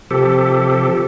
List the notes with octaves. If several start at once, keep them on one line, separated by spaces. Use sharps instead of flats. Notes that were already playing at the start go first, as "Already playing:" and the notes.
C3 F3 G4 A4